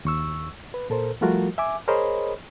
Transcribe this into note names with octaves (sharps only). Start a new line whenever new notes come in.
D#2 C#6 E6
B4
A#2 A4 A#4 C5
F3 G3 A3 F4 F#4 A#4
E5 G#5 D6
G#4 A#4 C5 C#5 D#5 B5